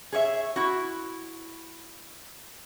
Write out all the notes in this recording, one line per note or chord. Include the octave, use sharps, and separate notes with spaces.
G#4 C#5 D5 E5
E4 F#4